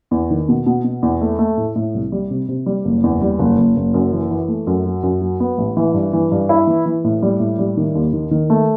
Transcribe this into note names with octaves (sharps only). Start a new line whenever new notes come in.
E2
D#3
B2
B2
B2
E2
A3
A3
A2
A2
C2
G3
C3
C3
G3
F#1
E2
G3
F#1
F#1
F#1
F#2
E3
E3
A3
F#2
F#3
F#2
F#3
B3
A1
E3
G2
E3
G2
E4
E3
E3
A2
G3
A2
G3
D#3
D#2
D#3
D#3
A3